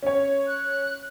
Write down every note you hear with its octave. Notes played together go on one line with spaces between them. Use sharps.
C#4 C#5
F#6